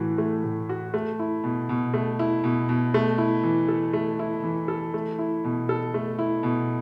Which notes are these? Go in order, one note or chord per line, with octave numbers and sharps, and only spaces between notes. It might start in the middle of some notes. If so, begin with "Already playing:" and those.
Already playing: A2 E3 F#4
A3
A2
F#4
A3
E4
B2
B2
A3
E4
B2
B2
A3
E4
E3
A4
A3
E4
E3
A4
A3
E4
B2
A4
A3
E4
B2